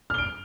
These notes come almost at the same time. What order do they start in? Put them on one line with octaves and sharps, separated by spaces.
F6 G7 D7